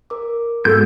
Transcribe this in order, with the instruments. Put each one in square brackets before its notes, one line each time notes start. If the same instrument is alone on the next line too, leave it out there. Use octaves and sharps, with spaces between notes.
[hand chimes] A#4 D6
[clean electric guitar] G#2 [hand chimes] B3 F#4 G#4 [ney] A4 [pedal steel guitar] G6